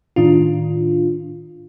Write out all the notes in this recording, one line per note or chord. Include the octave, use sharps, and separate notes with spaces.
A2 D#3 D4 F4